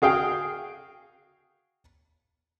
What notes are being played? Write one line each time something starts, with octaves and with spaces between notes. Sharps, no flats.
F#4 G#4 F5 G5